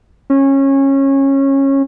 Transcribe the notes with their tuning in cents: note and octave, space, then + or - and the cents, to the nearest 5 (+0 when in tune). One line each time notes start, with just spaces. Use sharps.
C#4 -20